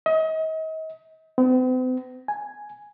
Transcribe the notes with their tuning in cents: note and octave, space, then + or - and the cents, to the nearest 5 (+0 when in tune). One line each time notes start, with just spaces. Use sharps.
D#5 +35
C4 -45
G#5 +0